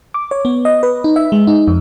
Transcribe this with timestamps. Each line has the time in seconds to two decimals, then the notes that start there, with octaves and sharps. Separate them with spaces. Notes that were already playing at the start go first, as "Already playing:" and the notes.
0.14 D6
0.31 C#5
0.45 B3
0.65 D#5
0.83 B4
1.04 D#4
1.16 E5
1.32 G#3
1.47 D#4
1.68 F2